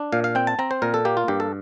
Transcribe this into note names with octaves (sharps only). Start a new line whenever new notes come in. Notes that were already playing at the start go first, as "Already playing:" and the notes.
Already playing: D4
A#2 F5
F5
C4 G5
A5
C4 A#5
C5
A#2 A#4
A4
A#3 G4
F4
G2 G4
A4